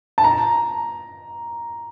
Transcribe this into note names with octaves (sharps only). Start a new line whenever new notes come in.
A5
A#5